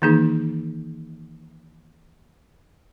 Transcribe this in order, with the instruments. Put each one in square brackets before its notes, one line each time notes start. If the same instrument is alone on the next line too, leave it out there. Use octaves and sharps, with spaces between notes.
[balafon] D#3 E3 A#3 D#4 G#4